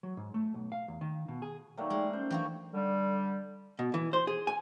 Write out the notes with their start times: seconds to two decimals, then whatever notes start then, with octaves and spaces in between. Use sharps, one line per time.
0.03 F#3
0.17 G#2
0.34 A3
0.54 B1
0.72 F5
0.88 E2
1.01 D#3
1.28 B2
1.42 G#4
1.78 F#3 A3 A#3 D#4 D5 G5
1.90 G3 G#3
2.13 C#4 C5
2.31 E3 F#3 D4 F#4 F5 G5 C#6
2.74 D3 G3
3.79 B2
3.94 E3
4.13 C5
4.27 G#4
4.47 G#5